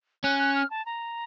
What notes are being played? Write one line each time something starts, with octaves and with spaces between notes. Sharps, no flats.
C#4 F#6
F#6
F6
A5
A#5